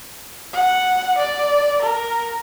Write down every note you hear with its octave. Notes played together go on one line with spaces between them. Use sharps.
F#5
D5
A#4